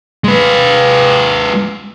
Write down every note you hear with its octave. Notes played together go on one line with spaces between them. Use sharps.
G#3 B4